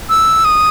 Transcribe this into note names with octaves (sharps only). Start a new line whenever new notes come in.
E6
D#6